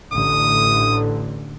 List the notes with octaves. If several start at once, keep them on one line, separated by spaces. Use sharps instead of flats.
A1 D3 D#6